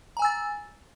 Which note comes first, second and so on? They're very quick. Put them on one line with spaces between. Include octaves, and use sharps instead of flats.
A#5 G#5 E6 A6